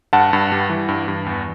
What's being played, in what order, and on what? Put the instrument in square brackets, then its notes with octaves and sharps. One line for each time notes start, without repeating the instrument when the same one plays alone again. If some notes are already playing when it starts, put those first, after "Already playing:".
[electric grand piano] G2 F#5 A5
G2
G3
E3
G2
G2
E2